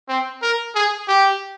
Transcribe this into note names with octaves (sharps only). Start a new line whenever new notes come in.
C4
A#4
G#4
G4